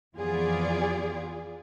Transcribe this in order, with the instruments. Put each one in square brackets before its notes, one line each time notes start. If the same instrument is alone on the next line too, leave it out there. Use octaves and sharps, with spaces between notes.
[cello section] F2 E3 B3 F4 G#4 D5